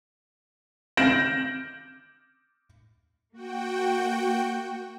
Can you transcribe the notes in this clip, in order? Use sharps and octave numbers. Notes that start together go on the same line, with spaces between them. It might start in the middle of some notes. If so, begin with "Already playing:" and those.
F6 G6 A#6 D7 E7 F#7
A#3 F#4 G5